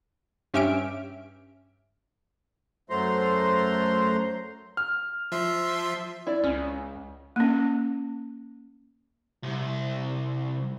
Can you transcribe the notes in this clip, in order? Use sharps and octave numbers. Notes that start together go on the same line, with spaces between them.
G2 C#4 G4 E5 F6 D7
F#2 F#3 A3 C5 A#5 C6
F6
F3 E5 C6
E4 D5
C#2 C#4
A#3 C#4
C2